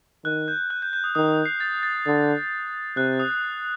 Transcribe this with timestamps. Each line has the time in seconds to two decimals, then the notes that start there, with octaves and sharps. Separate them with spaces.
0.25 D#3 F#6
0.48 G6
0.70 F#6
0.82 G6
0.93 G6
1.04 D#6
1.15 D#3 D#6
1.46 C7
1.60 A6
1.83 A6
2.07 D3
2.96 C3 F#6
3.20 D#6